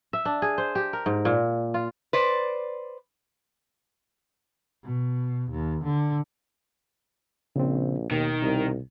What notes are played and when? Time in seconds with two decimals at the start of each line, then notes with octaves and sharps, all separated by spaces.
0.13 E5
0.25 D4
0.42 G#4
0.58 C5
0.75 G4
0.93 A#4
1.06 G#2
1.25 A#2
1.74 F4
2.13 B4 C5 D5
4.84 B2
5.51 D#2
5.84 D3
7.56 A#1 C#3 C4
8.11 D#2 B2 D#3
8.42 C2